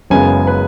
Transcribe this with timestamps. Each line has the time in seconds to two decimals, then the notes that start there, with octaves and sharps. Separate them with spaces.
0.10 F#1 F#2 C#3 G#3 B3 G#5
0.47 B4